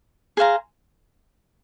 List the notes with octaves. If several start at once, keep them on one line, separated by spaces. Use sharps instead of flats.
G#4 C5 F5 A#5